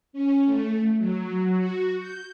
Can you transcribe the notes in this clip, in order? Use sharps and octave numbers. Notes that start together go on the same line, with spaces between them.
C#4
A3
F#3
F#4
G6